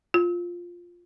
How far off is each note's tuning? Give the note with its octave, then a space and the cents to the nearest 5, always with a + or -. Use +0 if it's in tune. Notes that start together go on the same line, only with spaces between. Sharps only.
F4 +5